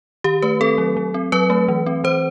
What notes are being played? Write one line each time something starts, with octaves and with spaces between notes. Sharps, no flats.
D#3 G4
A3 B4
C4 A4
F#3
F#3
C4
F#3 B4
A3
E3
C4
E3 C5